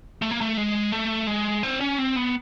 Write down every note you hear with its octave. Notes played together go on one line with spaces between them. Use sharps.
A3
A#3
A3
G#3
A3
G#3
C4
C#4
C4
B3